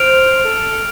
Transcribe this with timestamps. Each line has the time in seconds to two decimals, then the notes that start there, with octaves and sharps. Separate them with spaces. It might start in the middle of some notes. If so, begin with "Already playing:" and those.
Already playing: C5 F6 D7 F7
0.45 A4